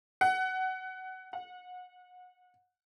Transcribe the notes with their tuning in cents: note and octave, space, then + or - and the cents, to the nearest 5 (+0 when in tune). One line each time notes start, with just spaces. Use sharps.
F#5 +20
F#5 -30